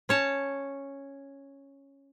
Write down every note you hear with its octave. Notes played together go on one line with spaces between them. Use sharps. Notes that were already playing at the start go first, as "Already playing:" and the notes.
C#4 C#5 A5